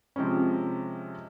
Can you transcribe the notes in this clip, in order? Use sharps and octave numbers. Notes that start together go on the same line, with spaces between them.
C3 F3 G#3 C4 C#4